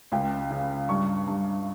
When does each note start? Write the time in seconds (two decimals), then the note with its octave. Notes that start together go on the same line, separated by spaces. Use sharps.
0.12 C#2 G5
0.50 C#3
0.89 G2 C#6
1.27 G2